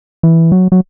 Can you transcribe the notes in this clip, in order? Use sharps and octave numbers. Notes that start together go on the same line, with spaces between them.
E3
F#3
F#3